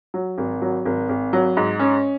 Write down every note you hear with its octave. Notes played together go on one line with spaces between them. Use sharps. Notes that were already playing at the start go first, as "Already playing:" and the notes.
F#3
G#1
F#3
G#1
G#1
F#3
G#2
C#4